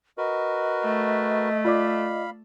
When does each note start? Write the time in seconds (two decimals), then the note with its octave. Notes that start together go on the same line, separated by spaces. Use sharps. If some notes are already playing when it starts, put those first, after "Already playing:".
0.18 F#4 A#4 B4 D#5
0.84 A3
1.65 F4 D5 F5 B5 D6